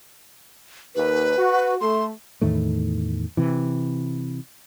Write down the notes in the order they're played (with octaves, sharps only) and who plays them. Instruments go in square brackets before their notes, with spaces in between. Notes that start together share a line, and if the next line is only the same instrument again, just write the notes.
[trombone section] D#2 [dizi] B4
[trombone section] F#4
[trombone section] A3 [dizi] C6
[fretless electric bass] E2 A2 D#3 A3
C3 E3